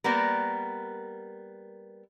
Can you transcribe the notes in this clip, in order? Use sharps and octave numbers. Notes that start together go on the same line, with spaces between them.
G3 A#3 B3 A#4